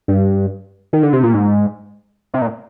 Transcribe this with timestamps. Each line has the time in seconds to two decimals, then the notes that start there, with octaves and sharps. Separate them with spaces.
0.08 G2
0.93 D#3
1.03 D3
1.13 C3
1.23 A#2
1.34 G#2
2.34 C3
2.41 A#2